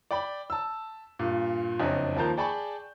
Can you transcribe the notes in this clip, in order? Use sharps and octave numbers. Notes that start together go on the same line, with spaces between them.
D5 G5 B5
A5 E6
G2 A#2
F#1 F2 D4 C#5 D#5
D#2 F3 A#3 A5 A#5 G6
G#4 D5 G5 A5 B5 C#6